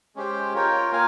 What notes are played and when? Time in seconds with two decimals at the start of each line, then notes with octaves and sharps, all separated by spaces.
0.16 G#3 C#4 G4 C5 G5
0.53 F4 A#4 C#5 G5
0.91 A#3 F4 A#4 F5 G#5